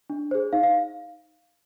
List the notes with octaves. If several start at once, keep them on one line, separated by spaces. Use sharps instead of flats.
D4
G#4 C5
D#4 F5
F5